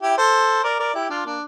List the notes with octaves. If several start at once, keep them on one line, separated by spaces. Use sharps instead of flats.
E4 G4
A4 C5
A#4 D5
A#4 D5
E4 G4
D4 F4
A#3 D4